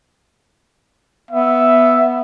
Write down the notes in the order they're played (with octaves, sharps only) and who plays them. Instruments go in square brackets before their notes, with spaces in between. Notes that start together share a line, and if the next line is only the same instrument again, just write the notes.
[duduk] B3 [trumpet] E5